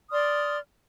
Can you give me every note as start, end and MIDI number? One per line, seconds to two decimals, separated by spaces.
0.11 0.58 74
0.11 0.58 84
0.11 0.58 87
0.11 0.58 89